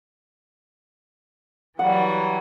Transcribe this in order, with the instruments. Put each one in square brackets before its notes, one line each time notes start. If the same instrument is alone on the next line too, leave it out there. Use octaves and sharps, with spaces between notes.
[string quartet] E3 F#3 G3 [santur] F#5